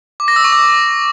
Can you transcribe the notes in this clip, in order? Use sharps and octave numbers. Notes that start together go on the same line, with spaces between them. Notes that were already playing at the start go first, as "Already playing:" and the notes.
D6
A#6
E6
C#6
D6